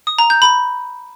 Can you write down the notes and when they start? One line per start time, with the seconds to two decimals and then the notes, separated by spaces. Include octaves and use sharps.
0.07 D#6
0.19 A#5
0.30 G6
0.42 B5